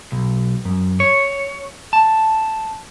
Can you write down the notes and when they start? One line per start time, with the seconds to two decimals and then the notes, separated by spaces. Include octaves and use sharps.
0.12 B1
0.65 F#2
1.00 C#5
1.93 A5